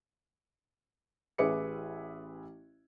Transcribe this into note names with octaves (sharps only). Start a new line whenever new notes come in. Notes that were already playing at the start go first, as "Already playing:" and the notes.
A1 G#4 B4 E5 D6 C#7